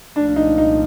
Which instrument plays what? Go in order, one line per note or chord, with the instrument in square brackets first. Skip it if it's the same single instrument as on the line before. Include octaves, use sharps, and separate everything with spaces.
[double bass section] C2 A#2 F3 A3 [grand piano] D4
[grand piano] D#4
D#4